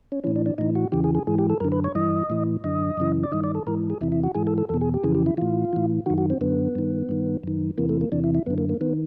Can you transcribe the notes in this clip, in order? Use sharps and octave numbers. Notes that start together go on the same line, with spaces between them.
C#4
A2 E3 C#4
D4
D4
A2 E3 D#4
F#4
E2 C#3 E3 G4
G#4
G#4
G#2 E3 G#4
G4
A4
F#2 D3 A#4
B4
C#5
G2 E3 D#5
A2 E3
F#2 D3 D#5
F#2 C#3 E3
D5
G2 D#3 D#5
D5
A4
G#2 E3 A#4
G#4
E2 C3 E3 E4
E4
F#4
G#2 E3 G#4
A4
A4
E2 B2 A4
G#4
G4
F2 C#3 E3 G#4
G4
E4
A2 E3 F4
A2 E3
F#2 D#3 F#4
F#4
C4
F#2 D3 B3
G2 D#3
G2 D#3
F#2 D#3
E2 C3 E3 A#3
A3
A#3
E2 C3 E3 D4
E4
E4
F#2 D3 B3
A#3
A#3
D#3 B3